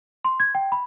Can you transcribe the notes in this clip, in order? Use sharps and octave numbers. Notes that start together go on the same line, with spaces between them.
C6
G#6
G5
B5